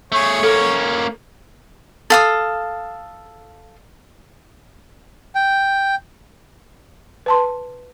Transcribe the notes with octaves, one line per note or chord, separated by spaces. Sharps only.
A3 G#4 C#5
A#3 C#4 A4
A4 F5 D#6
G5
B4 A5 C6